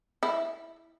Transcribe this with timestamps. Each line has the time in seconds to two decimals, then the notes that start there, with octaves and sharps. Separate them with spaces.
0.23 E4